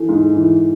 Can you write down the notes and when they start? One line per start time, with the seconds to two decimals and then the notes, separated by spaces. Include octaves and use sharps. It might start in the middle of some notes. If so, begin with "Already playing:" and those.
Already playing: E3 A3
0.09 G#2
0.34 E3